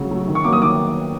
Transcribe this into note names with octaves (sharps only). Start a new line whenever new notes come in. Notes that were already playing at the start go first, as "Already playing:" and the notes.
Already playing: C#3 F#3 A3
F#3 A3
D#3
C#6
F#3 A#3 D6
D#6
D#3 D6